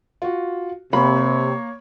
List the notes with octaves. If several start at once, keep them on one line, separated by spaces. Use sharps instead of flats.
F4 F#4
C3 A#3 C#5 B5